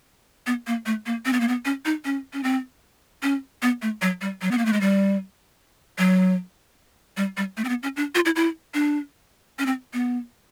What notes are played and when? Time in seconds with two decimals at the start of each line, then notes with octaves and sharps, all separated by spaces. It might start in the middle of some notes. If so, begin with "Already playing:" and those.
0.47 B3
0.67 A#3
0.86 A3
1.06 A#3
1.26 C4
1.33 B3
1.40 A#3
1.48 B3
1.65 C#4
1.85 D#4
2.05 C#4
2.33 C#4
2.44 C4
3.23 C#4
3.62 B3
3.82 A3
4.02 F#3
4.21 G3
4.42 F#3
4.51 B3
4.58 A#3
4.65 A3
4.73 G#3
4.81 G3
5.98 F#3
7.17 G3
7.37 G3
7.57 A3
7.64 C4
7.69 B3
7.83 C#4
7.97 D4
8.15 F4
8.25 E4
8.36 E4
8.74 D4
9.59 C#4
9.66 C4
9.93 B3